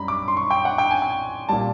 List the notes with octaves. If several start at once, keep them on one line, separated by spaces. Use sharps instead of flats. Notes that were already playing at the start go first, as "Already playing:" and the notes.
Already playing: F#2 G3 A#5 B5
D6
C6
C#6
G5
F#5
G5
G#5
G5
A#2 G3 A5